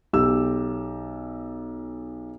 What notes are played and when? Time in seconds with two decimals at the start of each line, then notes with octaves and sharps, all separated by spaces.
0.13 B1 G4 E6